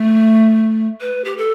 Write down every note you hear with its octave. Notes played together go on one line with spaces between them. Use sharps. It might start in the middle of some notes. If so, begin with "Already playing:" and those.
Already playing: A3
B4
G4
A4